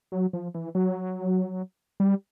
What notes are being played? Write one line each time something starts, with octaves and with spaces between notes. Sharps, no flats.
F#3
F3
E3
F#3
G3